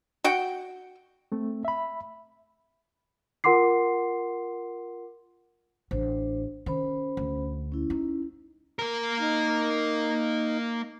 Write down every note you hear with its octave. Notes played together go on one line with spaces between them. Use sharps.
F#4 F#5 G5
A3 C4
E5 B5
F4 A#4 F#5 C6 D6 C7
A1 D4 C5
D#3 C#4 C5 B5
D2
C#4 E4
D#4
A#3 A#4
D#4